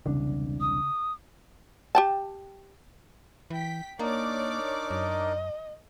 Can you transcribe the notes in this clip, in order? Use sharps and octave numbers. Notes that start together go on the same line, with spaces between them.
E1 C2 C#3 D4
D#6
G4 G5 A5
E3 G5 B6
A#3 D4 D#4 A#4 C#5 D5 D6
F#2 D#5